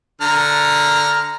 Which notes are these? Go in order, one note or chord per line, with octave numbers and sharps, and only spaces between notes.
D3 A#5 F6